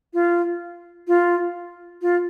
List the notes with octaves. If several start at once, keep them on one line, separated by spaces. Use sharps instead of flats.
F4
F4
F4